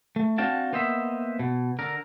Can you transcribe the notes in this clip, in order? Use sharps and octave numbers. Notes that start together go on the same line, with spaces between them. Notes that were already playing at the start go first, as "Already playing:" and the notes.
A3
C4 D4 F#4 F5 G5 A5
A#3 B3 C5 D#5 E5
B2
D3 A#4